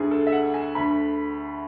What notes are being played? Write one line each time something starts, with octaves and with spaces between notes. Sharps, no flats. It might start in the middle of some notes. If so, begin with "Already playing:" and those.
Already playing: D2 D3 G#4
A4
E5
F#5
G#5
D2 D3 B5